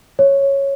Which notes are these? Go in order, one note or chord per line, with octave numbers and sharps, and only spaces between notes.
C#5